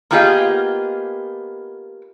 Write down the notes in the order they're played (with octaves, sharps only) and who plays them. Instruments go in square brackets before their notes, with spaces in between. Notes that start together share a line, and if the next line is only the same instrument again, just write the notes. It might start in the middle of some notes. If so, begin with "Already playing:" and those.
[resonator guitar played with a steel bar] A#3 B3 F4 G4 G#4 D#5